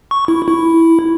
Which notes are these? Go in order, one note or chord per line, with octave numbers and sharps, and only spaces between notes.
C#6
E4
E4